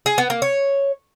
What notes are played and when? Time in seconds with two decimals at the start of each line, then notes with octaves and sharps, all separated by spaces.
0.06 G#4
0.18 B3
0.30 A#3
0.42 C#5